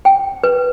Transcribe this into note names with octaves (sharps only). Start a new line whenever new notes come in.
G5
B4